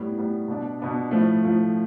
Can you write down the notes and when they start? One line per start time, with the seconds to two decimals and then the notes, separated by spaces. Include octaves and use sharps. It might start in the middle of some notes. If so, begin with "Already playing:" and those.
Already playing: A2 G3 B3
0.17 A2 G3 B3
0.48 B2 B3 D4
0.80 B2 B3 D4
1.11 A2 F3 A3
1.43 A2 F3 A3